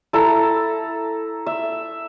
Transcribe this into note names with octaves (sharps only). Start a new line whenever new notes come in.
E4 A4 A#5
E5